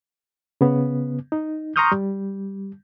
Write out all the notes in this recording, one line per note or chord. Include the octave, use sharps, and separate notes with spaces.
C#3 B3
D#4
A#5 C6 C#6 D#6 F6 G6
G3